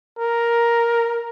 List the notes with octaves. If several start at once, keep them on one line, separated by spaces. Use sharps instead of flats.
A#4